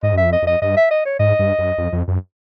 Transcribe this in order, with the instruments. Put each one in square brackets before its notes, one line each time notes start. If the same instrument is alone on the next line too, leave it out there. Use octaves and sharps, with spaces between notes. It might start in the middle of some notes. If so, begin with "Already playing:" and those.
[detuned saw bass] G#2 [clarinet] D#5
[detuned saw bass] F#2 [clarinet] E5
[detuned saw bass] F2
[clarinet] D#5
[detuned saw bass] F2 [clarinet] D#5
[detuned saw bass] G2 [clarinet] D#5
[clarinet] E5
D#5
C#5
[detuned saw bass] G#2 [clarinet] D#5
[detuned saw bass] G2
F#2
F2
F2
F#2